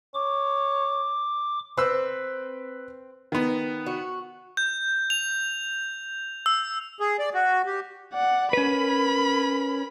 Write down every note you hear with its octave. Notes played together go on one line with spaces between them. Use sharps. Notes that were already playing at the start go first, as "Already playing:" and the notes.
C#5 D6
C4 B4 E6
D#3 B3
F#4
G6
F7
E6
G#4
D5
F#4
G4
D5 F#5
C#4 A#4 B4 B5